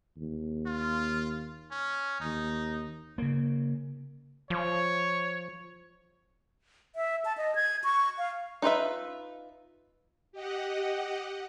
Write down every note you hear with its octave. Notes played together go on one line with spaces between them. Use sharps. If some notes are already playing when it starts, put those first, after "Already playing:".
D#2
F4
C#4
D#2 D#4
C#3 A#3
F3 C#5
E5
A5
D#5
G#6
C#6
F5
D#4 F4 B4 E5
G4 D#5 F#5